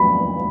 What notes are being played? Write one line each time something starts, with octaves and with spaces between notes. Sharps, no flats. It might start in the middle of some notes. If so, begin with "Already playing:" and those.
Already playing: B5